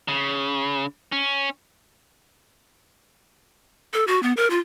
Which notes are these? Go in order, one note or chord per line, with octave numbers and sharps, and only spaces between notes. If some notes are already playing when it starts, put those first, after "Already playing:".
C#3
C#4
A4
F#4
B3
A#4
F4